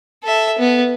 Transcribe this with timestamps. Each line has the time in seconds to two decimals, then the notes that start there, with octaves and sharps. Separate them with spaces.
0.24 A4 E5
0.59 B3